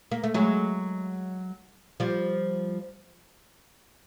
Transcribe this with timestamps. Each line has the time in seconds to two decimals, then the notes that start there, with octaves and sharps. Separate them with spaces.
0.11 A#3
0.24 A3
0.34 F#3 G#3
2.00 F3 G3